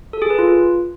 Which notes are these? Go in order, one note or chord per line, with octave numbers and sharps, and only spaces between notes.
A4
G#4
B4
F4